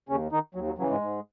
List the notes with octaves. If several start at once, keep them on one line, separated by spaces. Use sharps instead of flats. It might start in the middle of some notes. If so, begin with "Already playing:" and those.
D#2 C#3 C#4
D#3 D#4
D#2 F#3
F#3
C#3 E3 F#3
G#2 G#3
G#2